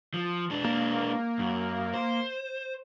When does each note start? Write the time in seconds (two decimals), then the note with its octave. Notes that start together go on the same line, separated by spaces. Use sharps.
0.14 F3
0.50 G#3 D4
0.65 A#3
1.39 F#2
1.94 C5